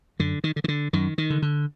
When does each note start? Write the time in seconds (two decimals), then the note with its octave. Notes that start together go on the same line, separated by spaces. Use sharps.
0.19 F#2 D3
0.44 D#3
0.56 D3
0.64 D#3
0.68 D3
0.93 F#2 D#3
1.18 D#3
1.30 D3
1.42 D3